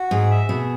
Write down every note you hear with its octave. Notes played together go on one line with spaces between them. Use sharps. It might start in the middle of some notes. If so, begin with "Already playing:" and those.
Already playing: F#4
G#2 G#4
E5
B2 G#4